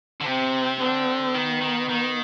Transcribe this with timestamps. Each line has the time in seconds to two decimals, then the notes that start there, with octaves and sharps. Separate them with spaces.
0.21 D3
0.26 C3 C4
0.80 D3 C4
1.34 D#3 B3
1.61 D#3
1.89 D#3